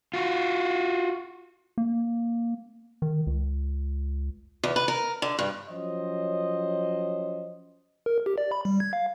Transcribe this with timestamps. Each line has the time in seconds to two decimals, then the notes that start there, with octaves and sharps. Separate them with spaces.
0.14 F4 F#4
1.78 A#3
3.02 D#3
3.27 C#2
4.64 E2
4.76 B4
4.88 A#4
5.22 D3
5.39 G2
5.69 F3 F#3 C#4 C5 D#5
8.06 A#4
8.26 G4
8.38 D5
8.52 B5
8.65 G3
8.80 G#6
8.93 F5